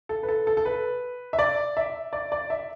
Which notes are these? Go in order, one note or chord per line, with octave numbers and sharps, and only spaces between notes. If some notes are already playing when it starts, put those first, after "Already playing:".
A4
B4
A4
A4
A4
B4
E5
D5
E5
D5
D5
E5